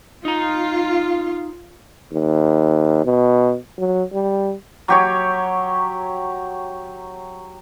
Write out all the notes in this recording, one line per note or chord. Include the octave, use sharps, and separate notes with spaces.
D#4 F4 A#5
D#2
B2
F#3
G3
F#3 G4 C#5